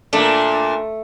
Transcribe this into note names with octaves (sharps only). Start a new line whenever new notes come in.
A#2 A3 A#3 D4